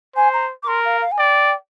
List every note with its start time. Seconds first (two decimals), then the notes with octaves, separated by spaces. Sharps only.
0.16 C5 G#5
0.33 A#5
0.62 D6
0.67 A#4 C6
0.84 F5
1.01 F5
1.11 G#5
1.18 D5 G5